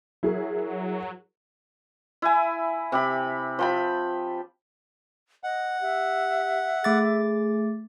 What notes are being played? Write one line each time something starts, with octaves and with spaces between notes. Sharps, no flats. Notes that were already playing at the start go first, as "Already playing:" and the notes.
F#3 E4 G#4 A#4
E4 G#5
C3 G4 B5
F3 G5 B5
D#5 F#5
G4 E5
A3 G#4 D6 A6